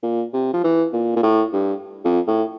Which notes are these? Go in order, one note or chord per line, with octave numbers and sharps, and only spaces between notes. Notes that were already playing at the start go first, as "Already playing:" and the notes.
A#2
C3
F3
E3
A#2
A#2
A2
G2
F2
A2